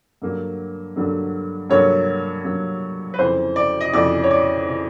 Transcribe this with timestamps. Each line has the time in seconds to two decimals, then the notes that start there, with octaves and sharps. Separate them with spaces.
0.22 G2 D3 F#3 A#3
0.96 G2 D3 F#3 A#3
1.70 G2 D3 F#3 A#3 C#5
2.44 G2 D3 F#3 A#3
3.14 B4
3.19 F2 C#3 E3 C5
3.56 D5
3.81 D#5
3.93 F2 C#3 E3 D5
4.24 C#5
4.31 D5
4.67 C#3 E3